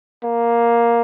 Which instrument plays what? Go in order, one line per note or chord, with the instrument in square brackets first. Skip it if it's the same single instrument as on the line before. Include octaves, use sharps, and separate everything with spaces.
[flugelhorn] A#3